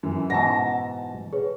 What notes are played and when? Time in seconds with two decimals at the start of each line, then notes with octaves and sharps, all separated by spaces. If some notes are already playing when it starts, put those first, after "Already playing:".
0.03 F#2 E3
0.30 G#2 B2 E3 F#5 A5 A#6
1.33 G#4 B4 C#5